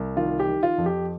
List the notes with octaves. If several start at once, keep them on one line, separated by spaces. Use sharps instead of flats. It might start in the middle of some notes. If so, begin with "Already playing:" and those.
Already playing: C2
D#3 F4
G4
D#3
F4
F2
G4